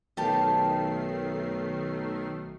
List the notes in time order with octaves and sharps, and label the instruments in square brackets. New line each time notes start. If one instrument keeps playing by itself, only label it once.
[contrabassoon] B1 [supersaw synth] D#3 A3 C7 [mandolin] G4 A5